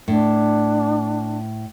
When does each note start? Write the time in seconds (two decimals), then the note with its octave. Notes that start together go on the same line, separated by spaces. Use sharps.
0.08 A2 D4